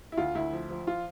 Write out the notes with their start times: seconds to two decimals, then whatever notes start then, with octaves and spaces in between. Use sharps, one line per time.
0.12 E4
0.17 D2 F4
0.35 D2 E4
0.53 F3
0.70 F3
0.87 F4